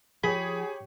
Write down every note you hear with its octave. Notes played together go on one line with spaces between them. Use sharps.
F3 G4 G#4 C#5 B5